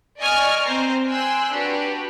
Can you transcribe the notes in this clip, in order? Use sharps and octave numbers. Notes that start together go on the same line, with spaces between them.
D5 D#5 G#5 C#6 F6
C4 C5 A#5
G5 G#5 C6 E6 F#6
D4 F#4 G4 B4